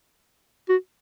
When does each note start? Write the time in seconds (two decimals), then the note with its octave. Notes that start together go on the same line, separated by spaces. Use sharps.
0.69 F#4